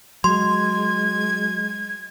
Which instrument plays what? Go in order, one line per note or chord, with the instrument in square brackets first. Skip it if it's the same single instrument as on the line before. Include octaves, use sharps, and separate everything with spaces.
[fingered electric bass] F#3 [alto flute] G#3 [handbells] C6 [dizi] G#6